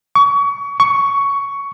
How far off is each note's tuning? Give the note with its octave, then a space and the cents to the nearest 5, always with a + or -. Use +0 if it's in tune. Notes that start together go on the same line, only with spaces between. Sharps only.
C#6 +30
C#6 +10